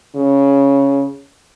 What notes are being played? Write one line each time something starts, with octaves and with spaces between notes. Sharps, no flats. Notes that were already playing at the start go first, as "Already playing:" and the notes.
C#3